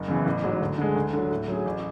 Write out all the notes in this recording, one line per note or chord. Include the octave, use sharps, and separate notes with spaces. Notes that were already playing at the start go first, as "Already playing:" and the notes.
Already playing: F#1
F#2 C#3 E3 B3
A1
G#2 F#3
D2
D3 G#3
D2
D3 F#3
A2
F#3 C#4 G#4
A1